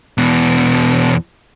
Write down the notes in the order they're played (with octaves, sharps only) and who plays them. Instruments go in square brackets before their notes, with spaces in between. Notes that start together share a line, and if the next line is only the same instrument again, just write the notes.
[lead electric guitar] E2 B2